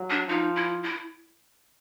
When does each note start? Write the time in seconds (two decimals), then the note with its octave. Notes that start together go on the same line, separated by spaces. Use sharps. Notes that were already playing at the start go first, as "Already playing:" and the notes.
Already playing: F#3
0.10 D4
0.28 F3 D#4
0.56 E4
0.83 E4